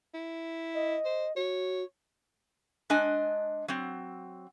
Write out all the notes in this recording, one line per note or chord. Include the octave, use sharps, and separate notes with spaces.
E4
D#5
C5
F#4 C#5
G#3 D4 D#5 G#5
F#3 C4